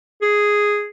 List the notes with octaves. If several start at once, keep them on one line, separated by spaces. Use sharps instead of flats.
G#4